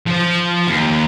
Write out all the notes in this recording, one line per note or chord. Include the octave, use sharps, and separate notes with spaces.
F3 C5
D#2